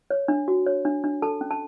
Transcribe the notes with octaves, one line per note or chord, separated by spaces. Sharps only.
C#5
D4
F#4
C#5
D4
D4
A4 A5
C#4
A5